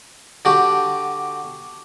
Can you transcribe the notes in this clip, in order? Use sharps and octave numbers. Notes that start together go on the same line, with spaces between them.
D3 F#4 G4